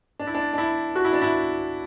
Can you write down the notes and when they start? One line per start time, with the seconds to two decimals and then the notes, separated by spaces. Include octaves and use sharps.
0.19 D4
0.27 E4
0.34 D4
0.53 D4
0.58 E4
0.96 F#4
1.04 E4
1.13 D4
1.22 E4